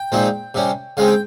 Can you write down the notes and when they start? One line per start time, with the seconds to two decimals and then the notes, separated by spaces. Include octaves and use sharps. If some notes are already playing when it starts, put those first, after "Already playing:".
Already playing: G5
0.12 A#2 F3 G#3 C4 D#4
0.54 C3 G3 C#4
0.97 C#3 G#3 C4 D#4 F5
1.08 G5